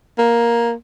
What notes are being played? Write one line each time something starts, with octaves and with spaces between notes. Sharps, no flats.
A#3